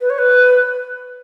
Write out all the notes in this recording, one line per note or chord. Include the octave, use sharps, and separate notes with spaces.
B4
C#5
B4